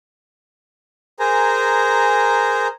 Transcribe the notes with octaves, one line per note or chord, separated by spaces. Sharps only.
G#4 A#4 C5 G#5 A#5